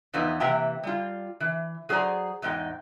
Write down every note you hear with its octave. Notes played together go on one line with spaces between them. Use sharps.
E2 E3 F3 B3 D#4
C3 E3 A#3 E5 G5 A#5
G3 F4
E3
F#3 G#4 C5 D5 A#5
E2 G#2 D#4 F4 G5